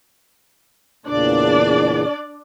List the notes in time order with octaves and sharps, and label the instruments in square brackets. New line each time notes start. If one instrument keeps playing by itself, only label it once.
[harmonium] E2 A#2 C#3 [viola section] D4 D5